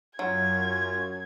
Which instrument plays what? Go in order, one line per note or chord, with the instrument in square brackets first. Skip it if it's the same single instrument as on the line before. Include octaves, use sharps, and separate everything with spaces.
[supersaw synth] F#2 [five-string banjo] F#3 [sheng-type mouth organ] C#4 F4 [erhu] G#6